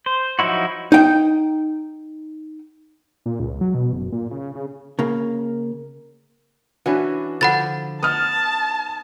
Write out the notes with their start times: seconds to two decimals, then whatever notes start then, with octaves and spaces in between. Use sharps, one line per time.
0.06 C5
0.39 F3 F#3 D#4 E4 F#4
0.92 D#4 G5
3.26 A#2
3.40 C#2
3.61 F#3
3.74 B2
3.93 F#1
4.12 A#2
4.31 C#3
4.55 C#3
4.99 C#3 A#3
6.86 E3 C#4 D4 F#4 B4
7.41 D3 F3 F#5 B5 A6
8.03 B3 D#4 A5 D#6 F6